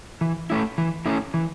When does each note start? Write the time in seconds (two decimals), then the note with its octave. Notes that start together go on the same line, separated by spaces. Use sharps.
0.21 E3
0.50 A3 C#4 E4
0.78 E3
1.06 A3 C#4 E4
1.34 E3